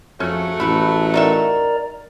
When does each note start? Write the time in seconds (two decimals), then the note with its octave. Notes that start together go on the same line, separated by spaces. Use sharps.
0.20 F2 G#2 F#3 A3 C#4
0.60 A1 E4 B4 A5
1.14 D#4 F#4 A#4 D5 E5 A#5